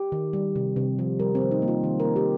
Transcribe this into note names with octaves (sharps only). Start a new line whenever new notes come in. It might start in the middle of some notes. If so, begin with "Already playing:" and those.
Already playing: G4
D#3
G3
C3
C3
F3
G3 A#4
C4
D#3
D#4
A#3
F4
D#3
A#3 A#4
G4